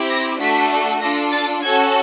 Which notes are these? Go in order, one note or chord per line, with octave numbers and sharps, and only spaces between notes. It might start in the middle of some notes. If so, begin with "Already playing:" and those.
Already playing: C4 E4 G4
A#6
A3 D4 F#4 A4 B6
D4 F4 A4 A#6
A6
C#4 F#4 A4 G#6